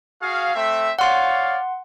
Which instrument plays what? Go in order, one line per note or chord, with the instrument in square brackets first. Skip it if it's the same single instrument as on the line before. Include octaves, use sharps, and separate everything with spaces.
[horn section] F#4 G#4 F5
A3 C4 E5
[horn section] C#5 D5 F5 [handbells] F#5 C6